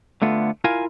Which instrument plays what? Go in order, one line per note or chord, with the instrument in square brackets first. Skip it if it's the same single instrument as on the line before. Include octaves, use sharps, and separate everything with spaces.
[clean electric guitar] D3 A3 B3 F4
E4 F4 A#4 F5 G#5